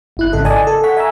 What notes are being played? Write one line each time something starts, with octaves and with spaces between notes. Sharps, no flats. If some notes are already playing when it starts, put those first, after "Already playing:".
G1 E4 F#6
G#1 C#3 A4 D#5
D5 D#5 G#5 A5 D#6
A4
F#5 C#6 B6
E5 G#5 A#5 E6